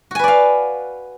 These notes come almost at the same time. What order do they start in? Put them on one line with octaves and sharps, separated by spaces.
F#4 G#5 B4 D5 F5